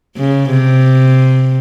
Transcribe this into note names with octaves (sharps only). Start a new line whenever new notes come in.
C#3
C3